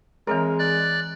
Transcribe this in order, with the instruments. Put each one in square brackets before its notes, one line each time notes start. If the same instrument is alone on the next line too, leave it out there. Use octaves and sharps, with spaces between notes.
[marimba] E3 C4 C#5 [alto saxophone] G#3 [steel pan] A#4
[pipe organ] D5 F#6